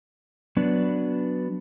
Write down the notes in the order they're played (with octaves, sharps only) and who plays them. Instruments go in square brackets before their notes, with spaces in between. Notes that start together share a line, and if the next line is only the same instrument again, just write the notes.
[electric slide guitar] F#3 B3 D4 B4